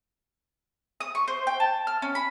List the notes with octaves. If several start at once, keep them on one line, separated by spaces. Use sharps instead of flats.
D#6
C#6
C5
G5
A5
F6
C#4
B5